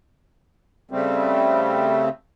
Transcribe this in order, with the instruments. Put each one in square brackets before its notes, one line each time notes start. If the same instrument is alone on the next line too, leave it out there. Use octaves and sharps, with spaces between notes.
[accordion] C#3 G3 A3 C4